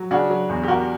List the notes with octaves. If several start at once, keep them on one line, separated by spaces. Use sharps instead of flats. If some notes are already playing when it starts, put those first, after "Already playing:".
Already playing: F#3
C#3 D4 F#4
F#3
E2
G4
E2 F#4 A#4